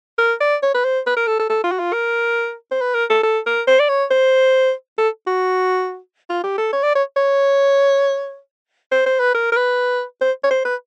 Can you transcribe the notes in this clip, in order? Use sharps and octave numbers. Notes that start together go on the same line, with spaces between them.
A#4
D5
C#5
B4
C5
B4
A#4
A4
A4
A4
F4
F#4
F4
A#4
C5
B4
A#4
A4
A4
A#4
C5
D5
C#5
C5
A4
F#4
F4
G4
A4
C#5
D5
C#5
C#5
C5
C5
B4
A#4
A#4
B4
C5
C#5
C5
B4